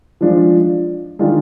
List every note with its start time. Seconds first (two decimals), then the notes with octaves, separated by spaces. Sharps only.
0.21 F3 G#3 D4 F4
1.19 D#3 G#3 D4 F4